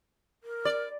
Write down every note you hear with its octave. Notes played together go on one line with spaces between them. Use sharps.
A#4
D5